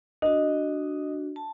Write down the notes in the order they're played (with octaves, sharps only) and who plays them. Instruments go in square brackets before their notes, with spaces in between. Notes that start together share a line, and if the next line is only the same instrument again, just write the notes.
[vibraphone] D4 F#4 [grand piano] D#5
[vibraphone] A5